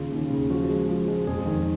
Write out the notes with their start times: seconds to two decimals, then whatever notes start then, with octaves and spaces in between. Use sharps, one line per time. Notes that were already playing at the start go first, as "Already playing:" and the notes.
Already playing: D#2 C#3 F4
0.12 D#2
0.30 C#3
0.50 F3 F#4
0.69 G#3
0.89 F3
1.08 G#3
1.27 F2 G#4
1.46 D#3